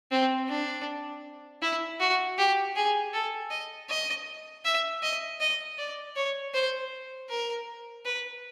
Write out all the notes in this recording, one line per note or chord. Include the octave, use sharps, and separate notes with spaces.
C4
D4
E4
F#4
G4
G#4
A4
D#5
D#5
E5
D#5
D#5
D5
C#5
C5
A#4
B4